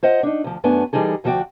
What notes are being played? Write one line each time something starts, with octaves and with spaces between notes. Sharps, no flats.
F4 C5 D#5 F#5
D4 D#4
D2 F3
F#2 A3 B3 D4 G#5
E3 G3 D#4 G#4 A4
D2 F3 E4 F#4 D5 G5